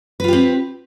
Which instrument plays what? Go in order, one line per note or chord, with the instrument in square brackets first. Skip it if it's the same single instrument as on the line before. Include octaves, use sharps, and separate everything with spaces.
[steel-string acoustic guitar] B4
F4
G4
C4